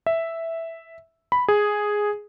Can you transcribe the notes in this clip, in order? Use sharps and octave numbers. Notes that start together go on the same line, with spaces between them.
E5
B5
G#4